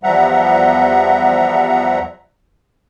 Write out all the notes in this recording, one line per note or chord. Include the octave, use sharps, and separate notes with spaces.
E2 F3 G3 E5 F#5 A#5